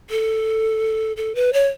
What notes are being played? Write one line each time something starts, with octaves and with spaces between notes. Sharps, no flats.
A4
A4
B4
C#5